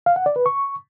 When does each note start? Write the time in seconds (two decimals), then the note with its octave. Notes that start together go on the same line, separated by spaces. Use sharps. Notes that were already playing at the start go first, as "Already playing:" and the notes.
0.06 F5
0.16 F#5
0.26 D5
0.36 B4
0.46 C#6